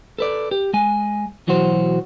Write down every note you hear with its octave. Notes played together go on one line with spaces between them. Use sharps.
A4 B4 D5
G4
G#3 G#5
B1 E3 F#3 F#4 C5